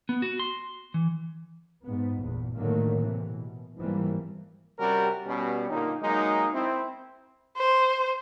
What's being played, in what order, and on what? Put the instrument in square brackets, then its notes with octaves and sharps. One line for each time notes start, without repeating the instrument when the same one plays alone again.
[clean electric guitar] B3
F#4
C6
E3
[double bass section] G#2 B3
G1 E2 A#2
A2 D3 D#3 F#3 A3 A#3
C3 E3
B2
G#1 G#2 E3 F3 G3 A#3
[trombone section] C3 G3 C#4 F#4 G4 A#4
B2 G3 C#4
A#2 D3 A#3 D#4
F#3 G#3 A#3 D#4
C4 E4
[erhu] C5